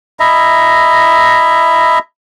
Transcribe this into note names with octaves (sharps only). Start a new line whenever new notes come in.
E4 D#5 E5 A#5